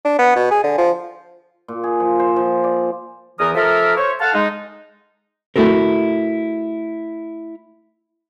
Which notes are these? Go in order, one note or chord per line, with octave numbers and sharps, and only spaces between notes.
D4
B3
B2
G#4
D3
F3
A#2
G#4
F3
C5
F3
D5
E2 E3 A#4 D#6
F3 A4 A#4 E5
C5 C#5
A4 F5 F#5 A5
G#3 D#4
A3 E4 F#4 A4 A#4